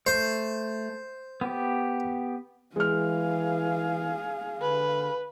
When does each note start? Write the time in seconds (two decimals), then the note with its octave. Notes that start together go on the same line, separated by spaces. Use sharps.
0.07 A3 C5
1.41 B3 G4
2.76 E3 G#3 G#4 F5 F6
4.61 D3 B4